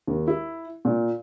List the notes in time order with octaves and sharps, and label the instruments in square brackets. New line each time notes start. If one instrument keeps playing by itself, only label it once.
[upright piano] D#2
E4
A#2